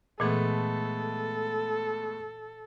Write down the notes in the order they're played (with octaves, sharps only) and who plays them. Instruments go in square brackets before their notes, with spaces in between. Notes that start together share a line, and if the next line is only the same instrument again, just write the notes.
[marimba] A#2 E3 [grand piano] G#3 A3 B3 [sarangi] A4